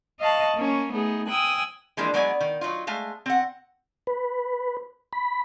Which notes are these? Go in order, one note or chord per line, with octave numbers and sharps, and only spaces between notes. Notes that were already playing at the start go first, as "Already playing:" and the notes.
D#5 F5 A5 C#6 F#6
A#3 C#4 C#5
A3 B3 D#4 G#4
G5 G#5 D#6 E6 F#6
E3 F3 G#3 A#3 D4
F#3 G#3 B3 D5 D#5 G#5
D#3
F#3 D#4 F4
G#3 A3 F5
C4 F#5
B4
B5